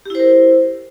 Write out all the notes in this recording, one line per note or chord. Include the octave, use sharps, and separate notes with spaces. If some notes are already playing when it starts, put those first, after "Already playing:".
E4 G4 A#4 C5